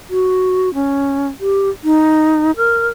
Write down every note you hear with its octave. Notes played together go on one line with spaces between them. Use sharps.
F#4
C#4
G4
D#4
A#4